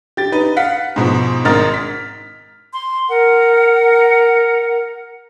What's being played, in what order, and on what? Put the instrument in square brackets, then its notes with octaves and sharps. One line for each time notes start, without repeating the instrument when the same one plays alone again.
[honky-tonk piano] G4 A6
D#4 B4
F5 F#5 B6
G#2 B2 F3
G#1 G#2 A#4 D#5 F6 A6
B6
[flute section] C6
A#4 F#5